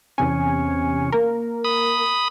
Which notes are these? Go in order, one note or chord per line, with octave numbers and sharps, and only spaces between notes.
E2 C3 C#4 G#5
A#3 A#4
B5 D#6